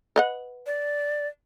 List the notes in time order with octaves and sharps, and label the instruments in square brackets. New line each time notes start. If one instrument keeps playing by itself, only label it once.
[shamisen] B4 D#5 F#5
[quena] D5